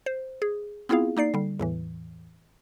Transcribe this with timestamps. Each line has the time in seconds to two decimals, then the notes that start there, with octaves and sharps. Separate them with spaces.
0.06 C5
0.42 G#4
0.89 B3 C4 E4 F4 G#4 F5
1.17 A#3 D#4 D5 C7
1.34 D3 G3
1.59 E2 A2 E3